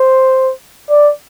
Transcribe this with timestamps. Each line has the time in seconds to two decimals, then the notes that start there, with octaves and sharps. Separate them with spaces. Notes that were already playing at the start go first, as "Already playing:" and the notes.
Already playing: C5
0.89 D5